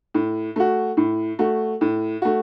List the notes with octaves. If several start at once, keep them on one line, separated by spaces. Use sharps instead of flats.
A2
A3 F#4
A2
A3 F#4
A2
A3 F#4